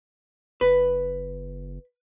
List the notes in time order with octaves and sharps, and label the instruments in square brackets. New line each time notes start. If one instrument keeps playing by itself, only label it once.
[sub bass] F#1 [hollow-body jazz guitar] B4